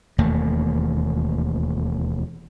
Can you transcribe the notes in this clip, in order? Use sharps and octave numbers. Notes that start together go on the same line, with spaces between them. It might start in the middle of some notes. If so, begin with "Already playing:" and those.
E1 D#2 A3 A#3